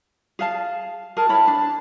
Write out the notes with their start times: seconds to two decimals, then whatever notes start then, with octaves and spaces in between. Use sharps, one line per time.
0.39 G#4 F5 A5
1.17 G#4 A#4 A5
1.29 E4 C#5 B5
1.47 D4